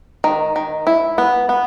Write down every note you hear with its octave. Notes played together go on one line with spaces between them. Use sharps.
D#3
D#3
E4
B3
B3